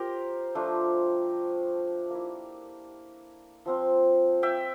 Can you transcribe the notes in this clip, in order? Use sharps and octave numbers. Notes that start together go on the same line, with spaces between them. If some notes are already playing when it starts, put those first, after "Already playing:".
Already playing: F4 G4 A#4 C5
F3 A3 D4
A#3 E4
F3 C4 F4
E5 G5